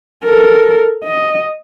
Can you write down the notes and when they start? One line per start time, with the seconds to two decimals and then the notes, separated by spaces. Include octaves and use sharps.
0.24 A4 A#4
1.04 D#5